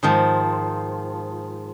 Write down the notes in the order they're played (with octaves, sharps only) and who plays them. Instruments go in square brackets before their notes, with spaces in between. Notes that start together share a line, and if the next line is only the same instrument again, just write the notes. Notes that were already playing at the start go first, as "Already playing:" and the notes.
[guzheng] G#2 D#3 F3